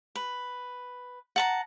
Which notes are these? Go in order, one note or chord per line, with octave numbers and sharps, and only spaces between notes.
B4
F#5 A5 A#5